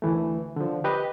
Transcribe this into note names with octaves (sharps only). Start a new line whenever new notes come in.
D2 E3 A3
D3 F3
G4 B4 D#5